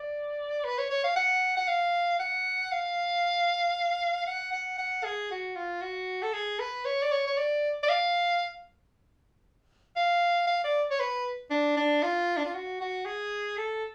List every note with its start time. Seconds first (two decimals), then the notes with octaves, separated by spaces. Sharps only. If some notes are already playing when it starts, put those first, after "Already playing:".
Already playing: D5
0.64 B4
0.78 C#5
0.90 C#5
1.04 F5
1.16 F#5
1.57 F#5
1.68 F5
2.19 F#5
2.72 F5
4.27 F#5
4.53 F#5
4.78 F#5
5.04 G#4
5.31 F#4
5.56 F4
5.82 F#4
6.23 A4
6.33 G#4
6.59 B4
6.85 C#5
7.03 D5
7.12 C#5
7.27 C#5
7.37 D5
7.83 D5
7.89 F5
9.96 F5
10.47 F5
10.64 D5
10.91 C#5
11.00 B4
11.51 D4
11.77 D4
12.03 F4
12.37 D4
12.45 F4
12.55 F#4
12.81 F#4
13.06 G#4
13.57 A4